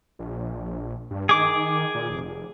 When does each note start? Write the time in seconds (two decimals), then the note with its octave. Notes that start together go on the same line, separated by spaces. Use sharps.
0.19 A#1
1.11 G2
1.29 D#3 G#4 D6
1.95 A#2
2.10 F1